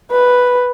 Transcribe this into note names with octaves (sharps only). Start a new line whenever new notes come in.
B4